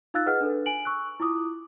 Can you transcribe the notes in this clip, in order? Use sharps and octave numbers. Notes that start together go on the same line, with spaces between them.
D#4 F4 F5 E6 F#6 A6
G#4 B4 D#5 F#5 F6
D4 A4 B4
G#5 D7 F#7
C#6 E6 F#6
E4 F4 D6 D#6